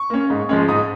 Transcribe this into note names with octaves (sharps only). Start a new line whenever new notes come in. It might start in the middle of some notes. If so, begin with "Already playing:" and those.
Already playing: C#6
A#3 C#4
G#2
F3 G#3 C#4
G#2 D#6